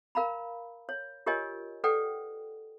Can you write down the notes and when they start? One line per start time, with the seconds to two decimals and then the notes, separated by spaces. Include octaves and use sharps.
0.15 A#4 F5 A#5 B5
0.89 C#5
1.26 F4 G4 A#4 C#5 D#5 G#5
1.84 A4 B4 D5 F#5 G5